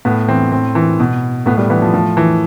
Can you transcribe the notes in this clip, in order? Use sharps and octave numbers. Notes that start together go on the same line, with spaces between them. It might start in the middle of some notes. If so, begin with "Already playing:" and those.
A2 B3
E3 C4
A2 C4
E3
B2
A2 B3
G3
E3 B3
F3
A2 F3
E3